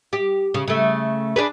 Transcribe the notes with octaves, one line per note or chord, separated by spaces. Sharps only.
G4
C#3
C#3 A3
D4 G#4 B4